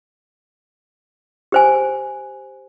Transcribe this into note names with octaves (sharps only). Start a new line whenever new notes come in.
G4 C5 G#5